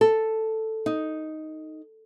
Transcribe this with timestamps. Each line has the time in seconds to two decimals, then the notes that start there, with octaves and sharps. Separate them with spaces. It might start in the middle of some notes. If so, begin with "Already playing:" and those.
0.01 A4
0.86 D#4